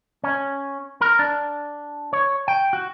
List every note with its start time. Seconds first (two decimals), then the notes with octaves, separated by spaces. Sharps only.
0.24 C#4
1.01 A#4
1.19 D4
2.13 C#5
2.48 G5
2.73 F#4